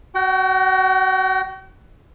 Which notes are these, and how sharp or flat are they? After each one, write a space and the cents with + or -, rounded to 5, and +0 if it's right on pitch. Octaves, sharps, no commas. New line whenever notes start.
F#4 +20 G5 -40